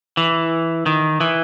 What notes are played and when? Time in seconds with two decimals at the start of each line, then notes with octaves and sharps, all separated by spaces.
0.17 E3
0.86 D#3
1.21 E3